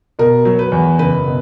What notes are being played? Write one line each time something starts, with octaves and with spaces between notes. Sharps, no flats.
B2 A#4
F#3
B4
E2
F#1 B4
B2